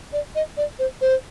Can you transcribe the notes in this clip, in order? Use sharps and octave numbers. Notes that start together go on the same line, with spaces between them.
D5
D#5
D5
C5
C5